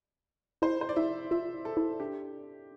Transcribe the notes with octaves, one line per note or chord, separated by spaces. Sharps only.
E4 C5
C5
D5
E4 E5
F4 E5
E4
A4
E4
D4 G4